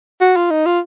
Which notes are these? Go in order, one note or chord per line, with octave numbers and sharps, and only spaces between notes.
F#4
F4
D#4
F4